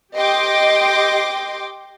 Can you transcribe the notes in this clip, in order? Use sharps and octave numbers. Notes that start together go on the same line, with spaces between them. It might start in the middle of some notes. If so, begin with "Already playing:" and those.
G4 D#5 G5 C6 D6